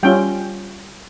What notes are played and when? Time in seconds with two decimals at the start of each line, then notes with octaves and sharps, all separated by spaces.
0.03 G3 C#4 F4 G5